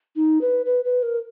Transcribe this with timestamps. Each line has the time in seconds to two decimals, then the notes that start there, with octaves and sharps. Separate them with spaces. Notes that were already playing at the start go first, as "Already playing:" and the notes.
0.16 D#4
0.41 B4
0.66 B4
0.85 B4
1.03 A#4